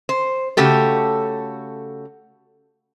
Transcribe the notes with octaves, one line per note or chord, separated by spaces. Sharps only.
C5
C#3 A3 F#4 G4 A4